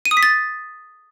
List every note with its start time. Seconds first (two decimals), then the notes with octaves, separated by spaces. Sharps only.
0.05 D#7
0.11 D#6
0.17 B6
0.23 A6